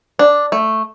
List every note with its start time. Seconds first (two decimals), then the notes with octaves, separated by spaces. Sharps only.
0.19 D4
0.52 A3